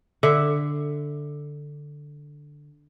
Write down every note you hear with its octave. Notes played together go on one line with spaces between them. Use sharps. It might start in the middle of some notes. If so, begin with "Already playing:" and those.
D3 E5